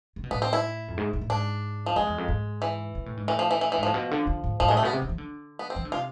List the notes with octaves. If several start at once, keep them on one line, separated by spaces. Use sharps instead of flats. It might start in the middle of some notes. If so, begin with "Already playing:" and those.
C3
B2
A2 B3
C4
E4
F2
G#2
G#2
A2
G#2 D4
F3
F2 G#3
E2
F2
G#2
E3
B2
A2
G#2
A2 E3
F3
E3
E3
E3
G#2
A2 F3
B2
D3
D3
G#2
G#2 F3
A2 G#3
A3
B2 B3
C3
D3
E3
D3
B3
C4
E3
D3
C3 F4